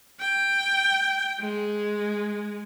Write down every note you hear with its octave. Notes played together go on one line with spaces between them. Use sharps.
G5
G#3